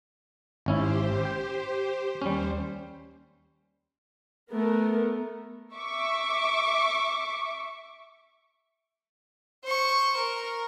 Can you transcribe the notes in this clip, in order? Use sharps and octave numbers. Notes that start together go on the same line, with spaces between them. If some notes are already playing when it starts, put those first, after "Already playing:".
G#1 C#4 E4 G4 C5
G5
D#2 G3 C#4 C5
A3 B3 A#4
E5 C#6 D6
C5 C#6
A#4